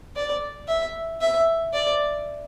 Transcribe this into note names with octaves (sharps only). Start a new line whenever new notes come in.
D5
E5
E5
D5